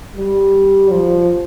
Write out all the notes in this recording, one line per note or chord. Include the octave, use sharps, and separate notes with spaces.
G3
F3